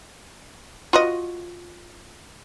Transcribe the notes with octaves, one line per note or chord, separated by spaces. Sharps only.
F4 F#4 D#5